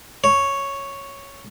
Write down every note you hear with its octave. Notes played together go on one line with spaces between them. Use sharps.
C#5